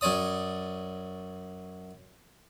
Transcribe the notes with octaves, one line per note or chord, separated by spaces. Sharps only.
F#2 C#5 D5 D#6